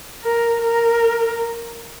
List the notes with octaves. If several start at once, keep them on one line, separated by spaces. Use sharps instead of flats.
A#4
A#4